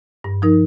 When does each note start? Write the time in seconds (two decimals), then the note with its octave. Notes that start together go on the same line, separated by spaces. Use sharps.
0.24 G2
0.42 F3 D#4 A#4